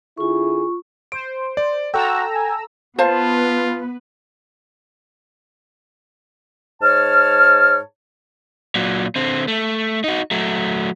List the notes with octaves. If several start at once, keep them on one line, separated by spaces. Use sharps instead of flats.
D3 E4 F4 G#4 C#6
C5 D7
D5
F#4 A4 G5 A#5 E6
G#5
B3 F4 B4 C5 F5 A5
G#2 C#5 A5 F6
A#2 F#3
D3 C4
A3
D#4 F#4
F#3 A3